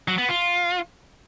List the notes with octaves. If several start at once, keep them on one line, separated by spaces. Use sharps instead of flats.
F#3
B3
F4